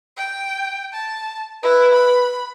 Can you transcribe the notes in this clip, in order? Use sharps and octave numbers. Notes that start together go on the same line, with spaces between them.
G5
A5
E4 B4
B5